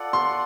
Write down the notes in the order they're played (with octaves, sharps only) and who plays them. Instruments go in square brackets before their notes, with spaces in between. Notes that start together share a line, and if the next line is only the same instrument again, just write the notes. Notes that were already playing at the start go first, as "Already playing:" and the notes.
Already playing: [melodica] F4 A4 D5 F#5
[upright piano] C6